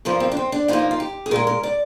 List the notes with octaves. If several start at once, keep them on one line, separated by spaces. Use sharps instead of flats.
G2 F3 A#3 A#4
C4
D4
C4
D4
G2 F3 A#3 D#4
F4
G4
G#4
A#2 G#3 A#4
A#4
D5